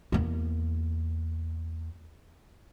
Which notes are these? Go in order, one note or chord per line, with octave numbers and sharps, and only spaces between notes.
E2 A#3